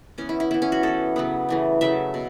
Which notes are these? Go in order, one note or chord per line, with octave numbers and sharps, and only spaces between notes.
E3 B3 C#4
E4
E4
E3 B3 E4
C#4
F#4
E3 B3 A4
C#3 F#3 B3
C#3 E3 A3
C#3 F#3 A3 E5
B2